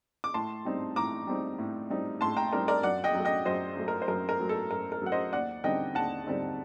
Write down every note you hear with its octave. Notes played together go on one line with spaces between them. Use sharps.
D6
A2 A5 C6
G3 C4 D#4
A2 A#5 D6
G3 C4 D#4
A2
G3 C4 D#4
A2 A5 C6
G5 A#5
G3 C4 D#4 A#4 D5
A#4 D5
F#2 D5 F#5
D#5 G5
F#3 A3
D#5 G5
F#2 C5 D#5
F#3 A3
A#4
C5
F#2 A#4
A#4
F#3 A3
A4
F#2 A#4
A#4
F#3 A3 F#5
C5 D#5
D#2 D5 F#5
D3 G3 C4 D#4 D#5 G5
D#2 F#5 A5
D3 G3 C4 D#4